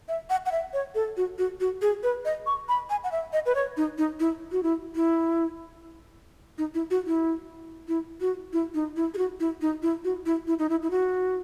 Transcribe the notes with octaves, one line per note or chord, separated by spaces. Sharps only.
E5
F#5
F#5
E5
C#5
A4
F#4
F#4
F#4
G#4
B4
D#5
C#6
B5
G#5
F#5
E5
D#5
B4
C#5
D#4
D#4
E4
F#4
E4
E4
D#4
E4
F#4
E4
E4
F#4
E4
D#4
E4
G#4
F#4
E4
D#4
E4
F#4
E4
E4
D#4
E4
E4
F#4